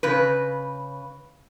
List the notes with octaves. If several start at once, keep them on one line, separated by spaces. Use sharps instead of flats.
C#3 B4